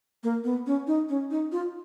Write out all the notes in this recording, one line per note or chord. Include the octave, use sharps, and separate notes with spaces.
A#3
B3
C#4
D#4
C#4
D#4
F4